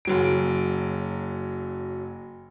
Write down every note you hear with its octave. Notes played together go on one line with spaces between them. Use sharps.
F#1 F#3 D7